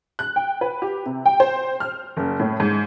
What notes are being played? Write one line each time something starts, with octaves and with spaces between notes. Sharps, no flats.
F#6
G5
B4
G4
C3
G5
C5
F6
F#1
A2
G#2